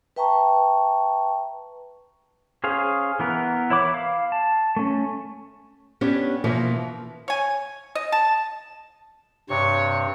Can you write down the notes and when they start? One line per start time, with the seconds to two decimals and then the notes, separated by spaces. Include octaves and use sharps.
0.16 B4 E5 G5 A5 A#5 C#6
2.64 C#4 G#4 C5 F5
3.20 E3 B3 A#4
3.70 E4 C#5 B5 D6
3.94 F5
4.32 A5
4.77 A3 C#4
6.01 B3 C#4 D4 G4 C#5
6.44 B2 E3 F3 A#3
7.28 C#5 G#5
7.95 D#5
8.12 A5
9.49 G2 C3 C#5 C#6